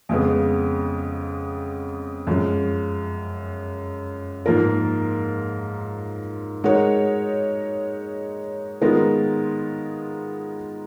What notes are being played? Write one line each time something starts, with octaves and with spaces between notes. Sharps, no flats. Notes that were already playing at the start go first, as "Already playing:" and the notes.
F2 C#3 G#3 B3
F#2 F3 G#3
G#2 F3 A#3 F4 A#4
G#3 D#4 F#4 A#4 C#5
D#3 G#3 B3 F4 A#4